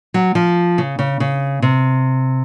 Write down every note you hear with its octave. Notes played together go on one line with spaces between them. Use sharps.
F#3
F3
C#3
C#3
C#3
C3